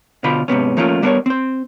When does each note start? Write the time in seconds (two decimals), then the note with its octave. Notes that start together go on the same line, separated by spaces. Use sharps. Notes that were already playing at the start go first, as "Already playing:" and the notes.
0.24 B2 D3 F4 C5 B5
0.48 G#2 C3 B3 C#4
0.77 F3 A3 A#3 C#4 D#4 F4
1.02 G3 B3 D4 A#4 B4 C#5
1.26 C4 C5